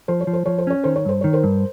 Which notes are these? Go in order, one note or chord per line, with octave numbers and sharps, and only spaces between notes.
F3 C5
C#5
F3
C5
F3 C#5
C5
C#4 C#5
D#3 C5
C#5
G2 C5
D#3 C#5
A#4 C5
G2